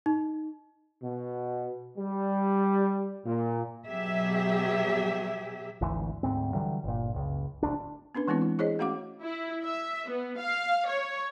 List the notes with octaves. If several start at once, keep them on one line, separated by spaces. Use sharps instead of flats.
D#4
B2
G3
A#2
B2 F#3 G4 G#4 E5
G#1 D2 E3
D2 G#2 C4
D3 E3 F#3 G3
G1 A#2
F#1 C#2
D1 D2 D4
B3 C#4 D4 B4
E3 G#3 B3 C4 E4
E4
E4 G#4 C5 C#5 D#5
A3 C#4 F#4 F5 F#5 D6
E4
E5
B3
F5
C#5